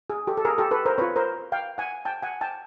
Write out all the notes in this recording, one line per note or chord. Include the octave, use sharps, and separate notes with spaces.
G#4
G4 A4
A4
G#4 A#4
G4 A4
A4 B4
A#4 C5
C4 F4 B4 C#5
A#4 C5
F5 G5
F#5 G#5
G5 A5
F#5 G#5
G5 A5